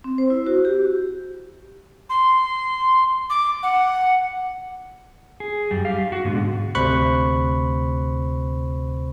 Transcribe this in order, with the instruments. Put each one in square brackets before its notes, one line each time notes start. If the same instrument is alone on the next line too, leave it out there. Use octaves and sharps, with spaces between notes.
[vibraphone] C4
C5
E4
F#4
G4
[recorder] C6
D6
F#5
[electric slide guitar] G#4
F#2 G3
G4 F5
F#4
G#2 B2 D3 G#3
[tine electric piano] D2 C3 C5 B5 C#6 F#6